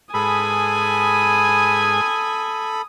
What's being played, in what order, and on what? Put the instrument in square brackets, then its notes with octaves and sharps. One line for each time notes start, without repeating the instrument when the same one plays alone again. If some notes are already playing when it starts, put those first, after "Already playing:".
[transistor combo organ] G#2 G#4 B4 [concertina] A4 B5 [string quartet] G#5 [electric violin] D#6